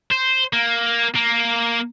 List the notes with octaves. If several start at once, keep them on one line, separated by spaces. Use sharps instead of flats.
C5
A#3
A#3